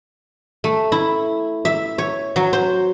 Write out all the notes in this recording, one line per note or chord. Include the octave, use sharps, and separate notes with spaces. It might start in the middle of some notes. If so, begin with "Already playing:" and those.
A3
E4
E5
C#5
F#3
C5